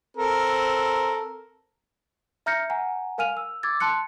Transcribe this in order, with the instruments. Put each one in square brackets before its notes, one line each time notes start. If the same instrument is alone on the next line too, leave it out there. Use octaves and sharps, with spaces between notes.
[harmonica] C4 A4 A#4
[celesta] E5 A#5 F6 G6 A#6 C#7
F#5 G#5 A#5
A#4 F5 G#5 F6 D#7 F7
E6
D6 E6 G#6 A6
A5 C6 F#6 C#7